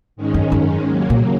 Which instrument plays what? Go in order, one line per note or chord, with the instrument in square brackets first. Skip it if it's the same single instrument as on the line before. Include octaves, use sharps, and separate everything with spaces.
[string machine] G#2 D#3 G#3 C#4
[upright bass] F#2
F#2
[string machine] D#2 C#3 F#3 A#3
[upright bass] A#2